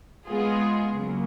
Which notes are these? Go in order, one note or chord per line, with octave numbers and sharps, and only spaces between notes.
G#3 B3 F4 G#4
C#3 F#3 A#3